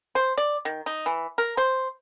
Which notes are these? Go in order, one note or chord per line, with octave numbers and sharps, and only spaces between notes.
C5
D5
D#3
D#4
E3
A#4
C5